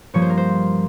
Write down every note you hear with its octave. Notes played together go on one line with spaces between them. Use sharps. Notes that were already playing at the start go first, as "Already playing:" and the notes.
G2 F3 A#3 C#5
C5
A#4
C5